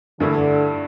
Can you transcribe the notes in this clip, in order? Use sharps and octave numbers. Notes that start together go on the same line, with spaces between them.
G2 D3 E3 A3 E4